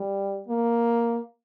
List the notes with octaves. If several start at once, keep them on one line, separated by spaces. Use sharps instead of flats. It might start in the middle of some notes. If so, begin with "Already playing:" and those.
Already playing: G3
A#3